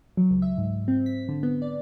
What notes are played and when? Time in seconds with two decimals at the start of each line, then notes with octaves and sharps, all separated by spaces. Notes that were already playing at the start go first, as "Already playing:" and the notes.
0.17 F#3
0.30 C#2
0.42 E5
0.58 G#2
0.88 C4
1.06 B6
1.28 D3
1.43 B3
1.62 D5